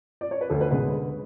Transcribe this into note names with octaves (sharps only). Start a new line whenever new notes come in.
D5
C#5
B4
D2 A4
B4
D3 G#3 B4